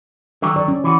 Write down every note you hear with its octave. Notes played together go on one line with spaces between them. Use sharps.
D3 D#3 F#3
D5
C#4
E3 F#4